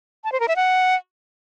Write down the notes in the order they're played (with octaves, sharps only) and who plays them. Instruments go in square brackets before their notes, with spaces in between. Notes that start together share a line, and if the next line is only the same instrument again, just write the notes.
[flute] A5
C5
A#4
E5
F#5